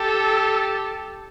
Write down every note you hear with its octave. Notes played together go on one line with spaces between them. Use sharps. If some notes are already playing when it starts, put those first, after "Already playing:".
Already playing: G4 A4